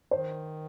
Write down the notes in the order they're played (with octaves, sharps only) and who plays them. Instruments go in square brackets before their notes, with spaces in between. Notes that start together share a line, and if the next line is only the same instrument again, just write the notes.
[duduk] D#3 [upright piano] C5